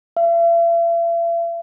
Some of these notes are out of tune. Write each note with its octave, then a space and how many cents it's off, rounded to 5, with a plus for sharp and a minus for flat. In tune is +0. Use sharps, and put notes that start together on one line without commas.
E5 +45